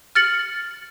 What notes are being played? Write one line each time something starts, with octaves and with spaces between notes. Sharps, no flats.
F6 A6 C#7 F#7